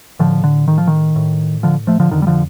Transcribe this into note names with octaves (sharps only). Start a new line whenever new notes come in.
A2 D3 F3
D3
D#3
F3
D#3
A2
D3 F3
F3 A3
D3 F3
F2 D3 D#3
G3
D3 F3